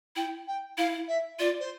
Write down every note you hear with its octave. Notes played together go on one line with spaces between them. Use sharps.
E4 G5
G5
E4 F5
E5
F4 D5
C5